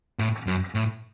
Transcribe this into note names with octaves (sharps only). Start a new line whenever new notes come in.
A2
F#2
A2